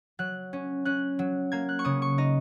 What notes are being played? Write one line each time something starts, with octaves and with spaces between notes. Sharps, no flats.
F#3 F#6
C#4
C#4 F#6
F#3
A#3 G#6
F#6
C#6
C#3 D#6
C#6
D#4 D#5